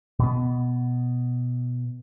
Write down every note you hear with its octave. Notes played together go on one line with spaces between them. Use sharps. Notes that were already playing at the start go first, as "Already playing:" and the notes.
B2 B3